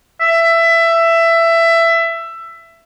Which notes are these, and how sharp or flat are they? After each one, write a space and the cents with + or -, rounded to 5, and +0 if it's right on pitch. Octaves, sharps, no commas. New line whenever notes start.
E5 +15